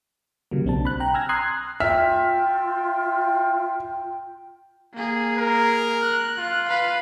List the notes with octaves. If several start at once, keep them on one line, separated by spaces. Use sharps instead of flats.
C#3 F#3 G3 A#3
B1 C4 D4 A5
B5 F#6
G5 A#5 F#6
G#5 E6 F6 G#6 A#6
A#5 C6 D#6 F#6 G#6 C7
F4 E5 G5 F6 B6
A#3 G#4
A#4
F#6
F4
B4 F5